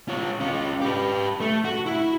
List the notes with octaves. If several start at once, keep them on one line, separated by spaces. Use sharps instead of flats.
F4 C#5
C#4 F4
G4 B4
A3
F#4
E4